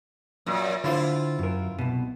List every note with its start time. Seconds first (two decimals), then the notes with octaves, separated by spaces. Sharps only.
0.46 F#2 A#2
0.84 D3 E4 F4 C5
1.39 F#2 A#4
1.79 C2 B2